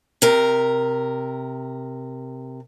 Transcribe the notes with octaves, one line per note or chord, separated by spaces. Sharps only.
C3 A#4